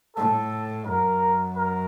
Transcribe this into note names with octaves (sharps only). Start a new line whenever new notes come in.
A2 A4
F#2 A#4
A#4